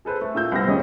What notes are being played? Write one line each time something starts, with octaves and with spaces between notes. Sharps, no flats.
G#4 A4 B4 C5
A3
A#2 E6 G6
C2 C3 B3 C5 A#6
D#1 C#2 C#4 D#5 D#6